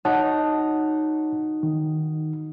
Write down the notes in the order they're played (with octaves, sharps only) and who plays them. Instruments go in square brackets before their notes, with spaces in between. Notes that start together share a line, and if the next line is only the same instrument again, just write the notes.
[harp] D#4 F#4 [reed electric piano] C#5 F#5 A5
[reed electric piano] D#3